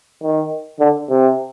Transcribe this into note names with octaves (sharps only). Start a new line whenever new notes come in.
D#3
D3
C3